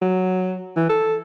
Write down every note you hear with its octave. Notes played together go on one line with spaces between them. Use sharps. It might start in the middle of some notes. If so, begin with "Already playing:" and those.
F#3
E3
A4